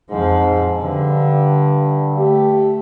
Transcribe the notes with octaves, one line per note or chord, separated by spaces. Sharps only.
F2 G#2 F3
G2 D3
A3 G4